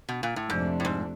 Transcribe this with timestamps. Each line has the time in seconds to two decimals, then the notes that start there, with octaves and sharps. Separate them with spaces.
0.09 B2
0.23 A#2
0.36 A2
0.50 F2 G#2 C3 F3 A3 D4
0.80 A2
0.85 G#2